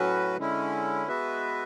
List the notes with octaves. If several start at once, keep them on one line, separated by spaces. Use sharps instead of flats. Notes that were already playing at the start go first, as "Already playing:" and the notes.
Already playing: A2 F#3 C#4 F#4 B4
D3 G#3 C#4 E4
G#3 B3 F#4 B4 E5